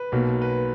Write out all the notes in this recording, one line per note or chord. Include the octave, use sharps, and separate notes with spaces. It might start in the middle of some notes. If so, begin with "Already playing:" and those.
Already playing: B4
B1 B2 A#3
B4